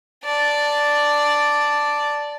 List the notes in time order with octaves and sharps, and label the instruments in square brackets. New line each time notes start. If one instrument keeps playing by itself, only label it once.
[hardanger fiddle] D5 A5